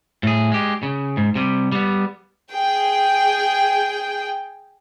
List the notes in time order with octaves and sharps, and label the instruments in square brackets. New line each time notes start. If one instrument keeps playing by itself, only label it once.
[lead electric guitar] A2 G#4
G#3 G4
C#3
G#2
C3 G3
G3 B3
[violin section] G#4 G5